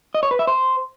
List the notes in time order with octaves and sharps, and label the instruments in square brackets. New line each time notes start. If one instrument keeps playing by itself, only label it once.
[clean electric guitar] D#5
C#5
B4
E5
C5